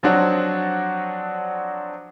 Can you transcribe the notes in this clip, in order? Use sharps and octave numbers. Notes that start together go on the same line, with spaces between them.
F3 F#3 C4 D4 F#4